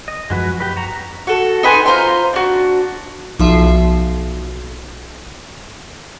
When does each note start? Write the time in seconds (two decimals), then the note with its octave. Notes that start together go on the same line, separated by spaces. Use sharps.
0.08 D#5
0.30 F#2 F3 G#3 F#4 B4
0.60 G4 B4
0.76 F#4 A#5
1.27 F#4 A4
1.63 D#4 B4 G#5 C6
1.86 F4 C5 A#5 C6
2.33 D4 F#4
3.40 B1 F3 E5 C7